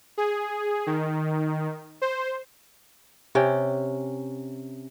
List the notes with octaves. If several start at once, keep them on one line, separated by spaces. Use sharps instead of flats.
G#4
D#3
C5
C3 C#4 G5